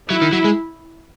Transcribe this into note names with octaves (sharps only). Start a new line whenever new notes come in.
F#3 E4
D#3
F#3
G#3